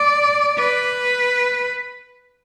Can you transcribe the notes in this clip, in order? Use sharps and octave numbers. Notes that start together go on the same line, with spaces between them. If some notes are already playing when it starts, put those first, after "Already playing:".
Already playing: D5
B4